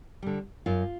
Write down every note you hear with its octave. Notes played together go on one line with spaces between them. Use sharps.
D3 G3
F#2 F4